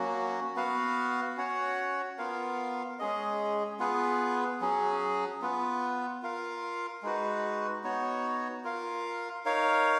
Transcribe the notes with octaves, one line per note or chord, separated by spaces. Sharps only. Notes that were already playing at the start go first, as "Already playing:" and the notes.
Already playing: F#3 A#3 C#4 F#4
B3 F#4 B4 F5
C#4 F#4 C#5 F#5
B3 F4 A#4 F5
G#3 C#4 G#4 D#5
B3 F4 G#4 B4
F#3 C#4 G#4
B3 F4 B4
F4 A#4 F5
G#3 D#4 F#4 B4
B3 D#4 F#4 C#5
F4 A#4 F5
D#4 A#4 C#5 F5